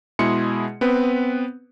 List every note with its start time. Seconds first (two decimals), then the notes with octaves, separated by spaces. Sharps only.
0.19 B2 G#3 E4 G#4 C6 C#7
0.81 B3 C4 B4